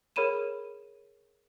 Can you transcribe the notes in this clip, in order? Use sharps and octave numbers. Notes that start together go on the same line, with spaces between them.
G#4 A#4 C#5 B5 D#7 E7